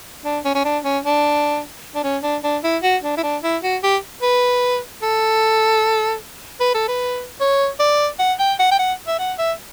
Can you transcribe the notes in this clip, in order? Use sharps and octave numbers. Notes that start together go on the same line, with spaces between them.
D4
C#4
C#4
D4
C#4
D4
D4
C#4
D4
D4
E4
F#4
D4
E4
D4
E4
F#4
G4
B4
A4
B4
A4
B4
C#5
D5
F#5
G5
F#5
G5
F#5
E5
F#5
E5